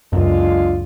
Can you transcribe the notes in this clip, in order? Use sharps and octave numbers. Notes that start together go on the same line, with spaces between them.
C#2 F#2 D3 G#3 F4